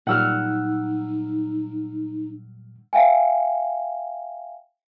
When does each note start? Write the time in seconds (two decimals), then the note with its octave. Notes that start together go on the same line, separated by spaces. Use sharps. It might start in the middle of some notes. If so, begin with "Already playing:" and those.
0.07 A#2 F#3 G3 D#4 F#5 E6 F6
2.93 E5 F5 G5 G#5